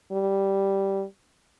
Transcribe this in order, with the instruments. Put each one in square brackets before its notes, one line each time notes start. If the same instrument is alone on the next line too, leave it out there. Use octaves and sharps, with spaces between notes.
[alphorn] G3